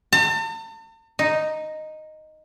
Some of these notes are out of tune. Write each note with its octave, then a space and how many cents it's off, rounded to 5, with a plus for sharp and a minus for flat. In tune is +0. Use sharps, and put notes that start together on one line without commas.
A5 +45
D#4 -5